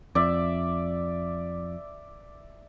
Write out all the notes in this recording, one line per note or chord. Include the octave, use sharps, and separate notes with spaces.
F2 D5 E5